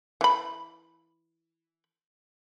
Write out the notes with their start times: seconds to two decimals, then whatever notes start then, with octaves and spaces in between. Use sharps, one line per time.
0.21 E3 B5